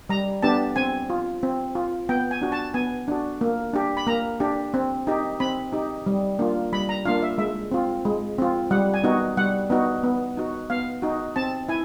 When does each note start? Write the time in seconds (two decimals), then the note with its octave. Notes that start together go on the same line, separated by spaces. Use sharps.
0.09 G3 A#5
0.43 B3 D4 G4 A5
0.76 C4 G#5
1.10 F4
1.43 C4
1.75 F4
2.09 B3 G5
2.31 G#5
2.42 D4 F#4
2.52 A5
2.74 B3 G#5
3.08 D4 F#4
3.41 A#3
3.73 D4 G4
3.97 B5
4.07 A#3 A#5
4.40 D4 G4
4.74 C4
5.07 D#4 G4
5.40 C4 B5
5.73 D#4 G4
6.06 G3
6.39 A#3 D4 F4
6.73 G3 B5
6.89 A#5
7.05 A#3 D4 F4 F5
7.23 E5
7.38 G#3 E5
7.72 C4 F4
8.05 G#3
8.38 C4 F4
8.71 G3 F#5
8.94 G#5
9.04 B3 D#4 F#4
9.37 G3 F#5
9.70 B3 D#4 F#4
10.03 B3
10.37 D#4 F#4
10.70 B3 F5
11.02 D#4 F#4
11.36 C4 A5
11.68 E4 G#5